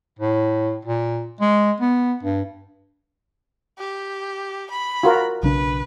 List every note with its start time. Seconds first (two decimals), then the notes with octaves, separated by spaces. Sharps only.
0.19 A2
0.85 A#2
1.41 G#3
1.80 B3
2.23 G2
3.79 G4
4.71 B5
5.03 F4 F#4 A#4
5.43 B1 C#3 D4 B4